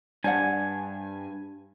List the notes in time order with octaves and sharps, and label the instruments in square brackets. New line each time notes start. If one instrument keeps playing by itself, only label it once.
[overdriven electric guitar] G2 [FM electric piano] D4 A5 [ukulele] C5 D5 F#5 [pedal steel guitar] G#5